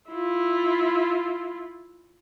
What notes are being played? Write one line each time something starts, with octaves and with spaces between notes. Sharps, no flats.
E4 F4